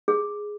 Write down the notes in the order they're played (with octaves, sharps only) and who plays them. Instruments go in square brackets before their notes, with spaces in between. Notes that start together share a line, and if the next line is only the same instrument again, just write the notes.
[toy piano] G#4